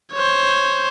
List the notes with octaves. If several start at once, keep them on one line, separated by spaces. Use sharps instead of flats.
C5 C#5